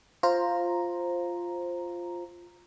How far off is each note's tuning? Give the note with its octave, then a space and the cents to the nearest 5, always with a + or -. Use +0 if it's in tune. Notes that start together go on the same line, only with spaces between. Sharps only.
F4 +0 C5 +10 A#5 +0